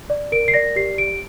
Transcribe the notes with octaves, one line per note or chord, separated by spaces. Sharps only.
D5
A#4 D7
C7
D5 A#6
G4 C7
G4 D7